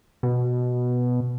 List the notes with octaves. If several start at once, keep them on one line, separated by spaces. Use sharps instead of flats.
B2